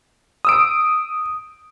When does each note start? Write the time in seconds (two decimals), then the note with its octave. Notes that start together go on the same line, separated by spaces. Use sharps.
0.45 D#6 E6 D7